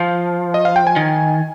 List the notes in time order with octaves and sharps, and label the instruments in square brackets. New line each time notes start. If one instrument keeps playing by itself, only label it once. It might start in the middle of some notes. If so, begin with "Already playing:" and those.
Already playing: [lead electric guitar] F3 [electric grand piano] F5
[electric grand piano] D#5
F5
G5
G#5
[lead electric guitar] D#3